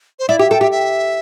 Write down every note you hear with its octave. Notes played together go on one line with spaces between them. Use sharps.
C5
E4 D5
G4 E5
A4 G5
G4 E5
E5